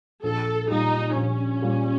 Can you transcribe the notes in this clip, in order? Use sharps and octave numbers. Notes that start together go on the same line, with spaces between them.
A#1 A4
A#2 G3 D#4
A#1 C#4
A#2 G3